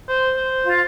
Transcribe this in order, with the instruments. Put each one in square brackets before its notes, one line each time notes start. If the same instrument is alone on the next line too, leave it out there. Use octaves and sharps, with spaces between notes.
[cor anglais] C5
C5
[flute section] F4